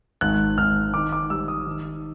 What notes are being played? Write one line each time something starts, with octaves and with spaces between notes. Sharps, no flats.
G#1 F#6
G#1 F6
D#3 D6
D6
G3 E6
D#6
D#3